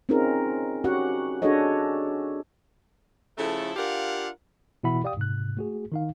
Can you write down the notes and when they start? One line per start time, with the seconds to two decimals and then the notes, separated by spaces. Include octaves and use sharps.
0.09 C4 C#4 D#4 F4 G#4 A#4
0.84 C#4 F#4 G4 F#5
1.42 D4 F#4 G#4 A4 C#5 D#5
3.38 C#3 F3 A3 E4 A4
3.76 D4 F4 G4 A#4 F5 F#5
4.83 B2 E3 E4 F#5 B5
5.04 G4 D5 F5 G5 D#6
5.17 G#2 C3 F#6
5.57 A3 F#4 G#4
5.92 D#3 D#4 F5